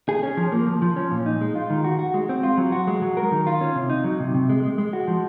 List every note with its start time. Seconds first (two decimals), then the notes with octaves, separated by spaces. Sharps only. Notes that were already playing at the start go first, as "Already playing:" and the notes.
0.09 G#4
0.23 C#4
0.37 F3
0.52 A#3
0.67 F3
0.82 F3
0.96 C#4
1.11 A#2
1.26 D#4
1.41 G#3
1.55 F4
1.70 D#3
1.84 F#4
1.99 F#4
2.14 G#3
2.29 C4
2.43 F4
2.58 F#3
2.72 F#4
2.87 G#3
3.02 F#3
3.17 A#4
3.32 D#3
3.47 F4
3.61 C#4
3.76 C3
3.90 D#4
4.04 F#3
4.20 C3
4.35 C3
4.49 G#3
4.63 G#3
4.78 G#3
4.93 F#4
5.08 F3